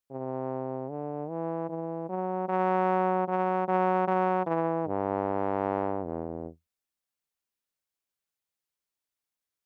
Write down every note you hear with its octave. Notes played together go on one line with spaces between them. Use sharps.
C3
D3
E3
E3
F#3
F#3
F#3
F#3
F#3
E3
G2
E2